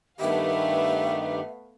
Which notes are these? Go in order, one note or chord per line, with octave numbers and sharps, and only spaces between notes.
G2 D#3 A3 B3 G4 E5 F5